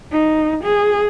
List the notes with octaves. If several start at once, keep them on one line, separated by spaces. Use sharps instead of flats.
D#4
G#4